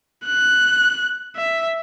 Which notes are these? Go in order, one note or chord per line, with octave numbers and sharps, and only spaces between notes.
F#6
E5